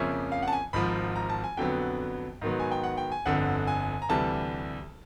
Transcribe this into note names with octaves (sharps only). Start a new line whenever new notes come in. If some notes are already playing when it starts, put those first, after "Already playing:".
Already playing: F2 C#3 F3 A#3 C#4 E5
F5
F#5
A5
G#5
G#1 G#2 F3 B5
A#5
A5
G#5
F2 D3 F#3 B3 G5
G#2 D#3 F#3 B3
G#5
G5
F#5
G5
G#5
G1 F2 D3 F#5
G#5
A#5
D2 C3 E3 G3 A5